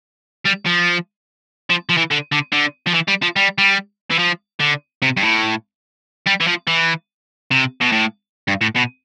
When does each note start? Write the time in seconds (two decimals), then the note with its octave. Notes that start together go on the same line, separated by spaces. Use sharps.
0.45 G3
0.66 F3
1.70 F3
1.89 F3
1.97 E3
2.11 D3
2.32 D3
2.52 D3
2.87 F3
2.94 E3
3.08 G3
3.22 F3
3.36 G3
3.58 G3
4.11 E3
4.19 F3
4.60 D3
5.02 C3
5.17 G2
5.22 A2
6.26 G3
6.40 E3
6.47 F3
6.67 E3
7.51 C3
7.81 B2
7.92 A2
8.48 G2
8.61 A2
8.76 B2